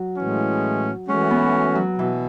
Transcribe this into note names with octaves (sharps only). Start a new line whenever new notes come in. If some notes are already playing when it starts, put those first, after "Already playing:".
Already playing: F#3
A2 E3 G#3 C#4
E3 G#3 A3 C#4 F#4
B3
F#3
B2 E3